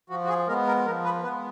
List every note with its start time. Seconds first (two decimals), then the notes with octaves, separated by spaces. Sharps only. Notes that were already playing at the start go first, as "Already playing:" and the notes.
0.10 F3 F#4
0.24 F#4
0.28 G#4
0.48 G#3 B3 A#4
0.67 A#4
0.86 F3 A#4
1.04 B4
1.23 G#3 B3 B4